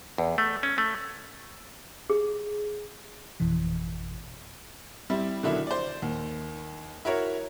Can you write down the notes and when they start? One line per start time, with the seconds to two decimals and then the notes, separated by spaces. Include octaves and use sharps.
0.18 E2
0.38 A3
0.63 C#4
0.78 A3
2.10 G#4
3.40 G#1 F2 B2 E3
5.10 G3 C4 E4
5.43 B2 D3 D#3 F#3 D4 E4
5.67 C5 D5
6.02 D#2
7.05 E4 F#4 A#4 C#5